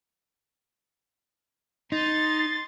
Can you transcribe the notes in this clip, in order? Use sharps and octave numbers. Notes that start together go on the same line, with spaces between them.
D#4 C6 A6